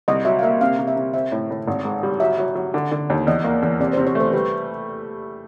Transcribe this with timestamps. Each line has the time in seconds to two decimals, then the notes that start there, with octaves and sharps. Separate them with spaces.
0.08 C2 D#5
0.25 F#3 E5
0.39 F5
0.43 A#3 E5
0.61 C3 F5
0.79 C3
0.87 E5
0.96 C3
1.14 C4 E5
1.32 A2
1.50 A2
1.68 G#1
1.85 G#2
2.03 G3
2.20 F#3 E5
2.38 F#3
2.55 F#3
2.74 D3
2.91 D3
3.10 D#2
3.27 E2 D#5
3.44 A#3
3.62 E2
3.80 C3 D5
3.93 C5
3.97 C3
4.07 C#5
4.15 A3 C5
4.33 G3 B4